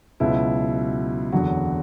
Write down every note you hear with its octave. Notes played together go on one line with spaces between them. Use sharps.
C#2 B2 F#3 E4
F#1 E2 D3 F#3 F#4